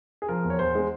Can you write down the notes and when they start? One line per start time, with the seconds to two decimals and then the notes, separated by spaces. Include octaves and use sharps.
0.22 G#4
0.28 F3 A#4
0.45 E2
0.50 C#5
0.59 E2 C5
0.75 G#3